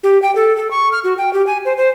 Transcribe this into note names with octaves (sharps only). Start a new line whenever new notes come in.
G4
G5
A4
A4
C#6
F6
F#4
G5
G4
G#5
C5
C5